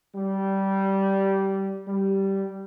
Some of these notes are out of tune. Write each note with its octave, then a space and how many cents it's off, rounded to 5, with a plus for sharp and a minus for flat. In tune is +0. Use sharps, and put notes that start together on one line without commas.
G3 -15
G3 -10